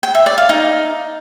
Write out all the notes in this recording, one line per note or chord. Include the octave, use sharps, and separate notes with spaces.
G5
E5
D5
F5
D#4